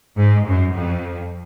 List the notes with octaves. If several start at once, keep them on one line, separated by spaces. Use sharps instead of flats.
G#2
F#2
F2